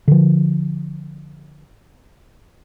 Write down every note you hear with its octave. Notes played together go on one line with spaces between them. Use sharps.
D3 F3